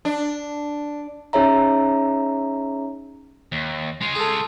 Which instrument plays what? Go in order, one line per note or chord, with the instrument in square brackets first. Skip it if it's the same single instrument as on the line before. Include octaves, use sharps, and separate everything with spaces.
[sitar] D4
[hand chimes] C#4 D#4 G#4 C#5 E5 A#5
[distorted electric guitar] D#2
G#3 F4
[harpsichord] G#4 A4